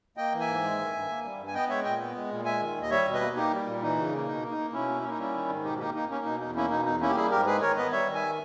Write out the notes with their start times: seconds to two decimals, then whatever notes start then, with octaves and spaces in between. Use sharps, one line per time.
0.17 A#3 D#5 G5
0.32 E3
0.40 E5 G#5
0.47 G#2
0.63 G#3
0.78 D#3
0.93 G2
1.09 A#3
1.24 G3
1.38 G2
1.47 G#5
1.54 B3 D#5 G5
1.69 G#3 C#5 E5
1.84 A#2 D#5 G5
2.00 B3
2.15 G#3
2.30 A#2
2.45 G#3 E5 G#5
2.60 D#3
2.75 D#2
2.82 D#5
2.90 G3 C#5 E5
3.06 B2
3.13 B4 D#5
3.21 A#3
3.36 A#3 D#4 G4
3.51 G3
3.67 A#2
3.82 E3 D#4
3.97 C#3
4.13 A#3
4.28 B2 D#4
4.43 A#3
4.51 D#4
4.58 A#3
4.73 B2 C#4 E4
4.88 A#3
5.02 A#3 C#4
5.10 D#4
5.18 G3 C#4 E4
5.34 D#3
5.49 G#2
5.63 B2 D#4 G4
5.79 A#3 D#4 G4
5.94 A#3 D#4
6.10 A#3 C#4
6.25 B2 D#4
6.40 E2 D#4
6.55 A#3 C#4 E4
6.70 B2 D#4
6.85 E2 D#4
7.01 A#3 C#4 E4
7.09 G4
7.15 G3 E4 G#4
7.31 G#2 G4 A#4
7.46 G#3 G#4 B4
7.61 D#3 A#4 C#5
7.77 B3 B4 D#5
7.91 G3 C#5 E5
8.07 D#3
8.15 E5 G#5